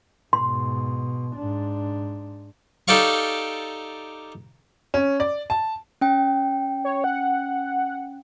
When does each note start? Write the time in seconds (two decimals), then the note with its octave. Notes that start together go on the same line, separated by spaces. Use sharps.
0.33 G#2 B2 C6
1.36 G#2 D4
2.88 D#4 G4 A4 D5 F5 C#6
4.94 C#4
5.20 D5
5.50 A5
6.01 C#4 G5
6.85 C#5
7.04 F#5